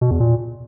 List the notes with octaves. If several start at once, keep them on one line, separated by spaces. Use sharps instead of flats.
B2
E2
A#2